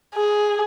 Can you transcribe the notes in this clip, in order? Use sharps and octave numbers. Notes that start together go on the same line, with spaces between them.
G#4